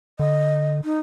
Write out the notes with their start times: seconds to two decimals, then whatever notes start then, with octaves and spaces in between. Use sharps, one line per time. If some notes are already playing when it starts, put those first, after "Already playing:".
0.19 D3 D#5
0.84 D#4